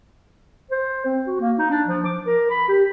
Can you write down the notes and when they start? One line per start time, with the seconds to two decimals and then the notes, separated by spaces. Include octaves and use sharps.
0.71 C5
1.05 C4
1.27 F#4
1.40 A#3
1.59 D#4
1.70 D4
1.87 F3
2.05 D6
2.26 A#4
2.50 B5
2.68 G4